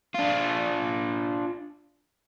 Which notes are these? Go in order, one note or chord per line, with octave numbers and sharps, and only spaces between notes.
D4 F4